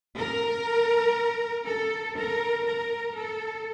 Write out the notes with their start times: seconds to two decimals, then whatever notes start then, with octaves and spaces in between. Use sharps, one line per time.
0.18 A#4
1.67 A4
2.17 A#4
2.66 A#4
3.16 A4